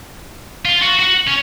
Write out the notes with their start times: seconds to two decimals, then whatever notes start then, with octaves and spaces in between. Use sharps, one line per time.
0.65 F4
0.82 F#4
0.99 F#4
1.27 C#4